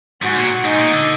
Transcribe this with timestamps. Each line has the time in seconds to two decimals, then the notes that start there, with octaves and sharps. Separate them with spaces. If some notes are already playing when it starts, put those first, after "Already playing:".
0.22 G#2 F#4
0.36 A#2
0.64 G#2 D#4
0.78 A#2
0.92 D3